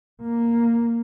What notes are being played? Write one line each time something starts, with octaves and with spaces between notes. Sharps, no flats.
A#3